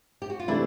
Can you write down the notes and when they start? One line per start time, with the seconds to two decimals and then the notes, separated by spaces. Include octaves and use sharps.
0.22 G4
0.30 F#4
0.39 F4
0.48 C3 E3 A3 D4 E4